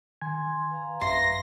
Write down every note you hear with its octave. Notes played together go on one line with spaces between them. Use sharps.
D#3 G#5 C6 G#6
B4 F5 A#5
A1 F#2 E5 C6 A#6